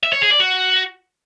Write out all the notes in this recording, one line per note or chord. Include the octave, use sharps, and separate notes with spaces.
E5
C#5
G#4
D5
F#4